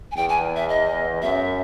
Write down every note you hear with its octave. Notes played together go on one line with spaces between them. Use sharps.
G#5
E2 G5
G#5
E5
D#5
F#2 E5